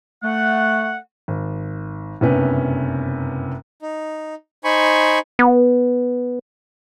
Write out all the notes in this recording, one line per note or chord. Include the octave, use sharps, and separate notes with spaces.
A3 F#5
G#1
F#1 G2 C3 B3 C#4 B4
D#4
D#4 C5 G#5 B5 C#6
B3